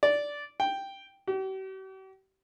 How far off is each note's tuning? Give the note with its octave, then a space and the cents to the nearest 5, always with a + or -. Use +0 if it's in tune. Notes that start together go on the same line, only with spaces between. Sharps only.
D5 -10
G5 +0
G4 -45